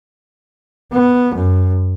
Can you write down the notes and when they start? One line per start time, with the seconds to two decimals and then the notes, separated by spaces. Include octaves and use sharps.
0.92 B3
1.35 F#2